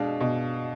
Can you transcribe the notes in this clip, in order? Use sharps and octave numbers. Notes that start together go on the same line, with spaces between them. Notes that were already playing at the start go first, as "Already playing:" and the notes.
Already playing: B2 G#3 D4 F5
B2